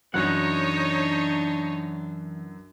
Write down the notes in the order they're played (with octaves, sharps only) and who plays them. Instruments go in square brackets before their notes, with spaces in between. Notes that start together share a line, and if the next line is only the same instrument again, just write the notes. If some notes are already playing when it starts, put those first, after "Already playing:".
[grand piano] F#2 F#3 [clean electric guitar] E3 F#5 [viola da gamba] D4 [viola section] D#4 C#5